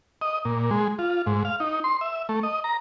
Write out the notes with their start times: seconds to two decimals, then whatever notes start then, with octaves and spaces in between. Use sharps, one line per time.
0.21 D#5
0.45 A#2
0.71 G#3
0.99 F4
1.26 G#2
1.45 F5
1.60 D#4
1.84 C6
2.01 E5
2.29 A3
2.43 D#5
2.64 A#5